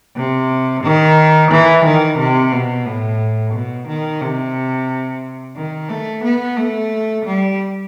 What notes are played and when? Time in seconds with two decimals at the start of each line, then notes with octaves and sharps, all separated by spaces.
0.15 C3
0.83 D#3
1.51 E3
1.85 D#3
2.18 C3
2.52 B2
2.86 A2
3.53 B2
3.87 D#3
4.21 C3
5.56 D#3
5.90 A3
6.24 B3
6.57 A3
7.25 G3